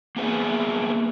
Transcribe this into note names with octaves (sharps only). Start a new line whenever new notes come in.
A#3 B3 G#4 B4 E5